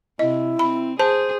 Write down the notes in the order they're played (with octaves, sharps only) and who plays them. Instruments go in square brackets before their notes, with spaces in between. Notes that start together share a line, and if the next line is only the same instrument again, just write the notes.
[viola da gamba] C3 [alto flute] E4 [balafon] D#5
[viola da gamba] C4 [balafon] B5
[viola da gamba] G#4 [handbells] C5 [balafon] A5